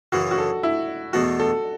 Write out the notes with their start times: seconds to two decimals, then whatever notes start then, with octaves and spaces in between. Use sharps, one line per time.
0.12 F#2 C#3 E3 F#4
0.31 F#4
0.38 A4
0.63 E4
1.13 E2 B2 A3 F#4
1.40 A4